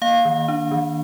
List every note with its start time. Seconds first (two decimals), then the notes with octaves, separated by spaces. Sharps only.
0.02 A#3 F5
0.25 D#3
0.48 D4
0.71 D#3